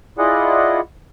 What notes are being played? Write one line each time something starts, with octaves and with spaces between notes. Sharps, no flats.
E4 F4 G#4 D5 D#5 F#5